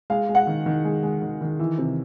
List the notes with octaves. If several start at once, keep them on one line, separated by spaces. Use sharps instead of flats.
G#3 F5
G#3
F#5
D#3
D#3
G#3
G#3
D#3
D#3
E3
C3